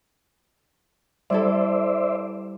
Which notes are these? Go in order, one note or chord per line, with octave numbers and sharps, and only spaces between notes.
G3 E4 A4 C5 D5 E5